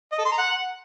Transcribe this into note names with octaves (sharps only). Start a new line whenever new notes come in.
D#5
A4
C6
A#5
F#5